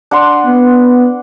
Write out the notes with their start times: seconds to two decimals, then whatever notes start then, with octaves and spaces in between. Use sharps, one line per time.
0.11 D4 F#5 C6
0.46 B3